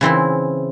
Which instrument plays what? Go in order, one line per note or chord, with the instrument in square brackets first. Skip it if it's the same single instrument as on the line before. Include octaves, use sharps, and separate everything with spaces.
[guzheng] C#3 E3 C4 E4